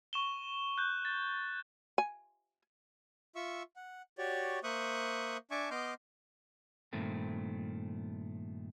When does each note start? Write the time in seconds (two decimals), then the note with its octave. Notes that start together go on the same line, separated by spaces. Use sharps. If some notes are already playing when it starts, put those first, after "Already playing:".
0.13 C#6 E7 G7
0.78 F#6 G6
1.05 A6
1.98 G#5
3.36 F4 E5 C#6 E6
3.76 F#5
4.18 F#4 G4 C#5 D5
4.64 A#3 C5 E5 C#6 D#6 F#6
5.51 D4 E5 G#5 A5 C#6 D6
5.71 B3 D#5 C6 D6 F6 G6
6.93 G2 A#2 D#3 A3 C4